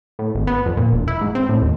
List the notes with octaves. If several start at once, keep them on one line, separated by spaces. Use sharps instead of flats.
A2
G#1
B3
F2
A#2
E1
E4
G#2
C4
A2
D#2